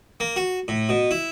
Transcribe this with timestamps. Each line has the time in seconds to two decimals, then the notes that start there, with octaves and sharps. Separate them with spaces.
0.20 A#3
0.36 F#4
0.68 A2
0.89 B2
1.11 E4